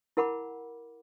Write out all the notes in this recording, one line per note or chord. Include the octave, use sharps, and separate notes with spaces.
E4 A#4 F#5 B5 D6